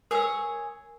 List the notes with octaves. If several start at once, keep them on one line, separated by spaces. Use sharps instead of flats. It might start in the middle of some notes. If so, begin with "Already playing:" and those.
G#4 A#4 C#5 E6